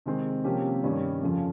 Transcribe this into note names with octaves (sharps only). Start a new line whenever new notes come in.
C3 D#3 G#3 C4
C3 F3 A#3 C#4 G4
G2 D#3 G3 C#4
F2 C#3 F3